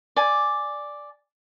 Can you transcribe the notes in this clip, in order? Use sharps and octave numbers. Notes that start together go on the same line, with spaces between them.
D5 G#5